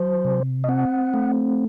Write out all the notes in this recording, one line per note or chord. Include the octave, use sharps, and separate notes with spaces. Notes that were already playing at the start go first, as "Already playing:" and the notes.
Already playing: F#3 C5
C3
D#5
C4 F#5
A3